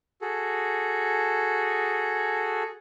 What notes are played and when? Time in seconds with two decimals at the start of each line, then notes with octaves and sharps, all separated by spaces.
0.21 F#4 G#4 A4